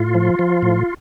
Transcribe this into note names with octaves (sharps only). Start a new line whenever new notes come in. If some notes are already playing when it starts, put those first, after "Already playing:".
Already playing: A2 F4
F3
F3
A2